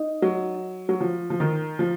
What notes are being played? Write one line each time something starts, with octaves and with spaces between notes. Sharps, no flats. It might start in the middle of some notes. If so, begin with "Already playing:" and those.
Already playing: D#4
F#3
F#3
F3
F3
D#3
F3